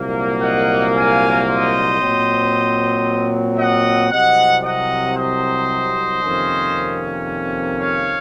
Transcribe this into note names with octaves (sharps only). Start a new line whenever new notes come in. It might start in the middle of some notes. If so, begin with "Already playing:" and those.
Already playing: C2 A#2 F#3 A#3
D#5 F#5
F5 G#5
C5 D#5
A#2 F#3 C4
D#5 F#5
C2 C3 F#3 D#5 F#5
D#5 F#5
C5 D#5
F2 C3 D#3 A#3 C#4
C#5 F5